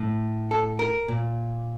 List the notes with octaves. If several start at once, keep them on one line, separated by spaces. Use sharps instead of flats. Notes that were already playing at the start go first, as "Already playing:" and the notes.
Already playing: A2
A4
A#4
A#2